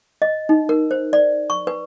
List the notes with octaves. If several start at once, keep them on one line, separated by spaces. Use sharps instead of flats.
D#5
D#4
A#4
C5
D5
C#6
B4